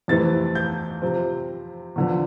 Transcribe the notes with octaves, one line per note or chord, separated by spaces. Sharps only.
F2 C3 E3 A3 C4 A6
G6
C3 F3 C4
E2 D3 F3